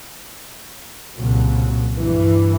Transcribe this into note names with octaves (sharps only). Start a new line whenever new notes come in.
C2 A#2 C#3 F#3
G2 E3